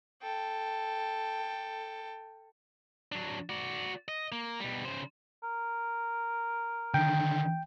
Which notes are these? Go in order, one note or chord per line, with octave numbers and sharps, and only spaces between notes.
A4 G5
F#3 D4
F#4 D5
D#5
A#3
B2 G3
C#3 C5
A#4
D3 D#3 G5